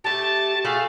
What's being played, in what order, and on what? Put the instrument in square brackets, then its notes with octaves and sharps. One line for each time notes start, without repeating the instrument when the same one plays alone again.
[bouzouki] A3 G4 [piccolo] A5
[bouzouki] A3 F#4 G#4 [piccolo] F5